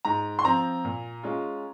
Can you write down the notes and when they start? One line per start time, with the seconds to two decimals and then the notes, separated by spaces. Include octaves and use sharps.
0.05 G#2 A#5
0.39 C6
0.45 F3 C4 A#5
0.85 A#2
1.23 G#3 C#4 F4